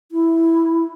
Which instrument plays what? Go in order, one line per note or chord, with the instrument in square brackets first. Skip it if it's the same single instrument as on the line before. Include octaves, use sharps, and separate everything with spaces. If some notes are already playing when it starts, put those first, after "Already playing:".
[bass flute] E4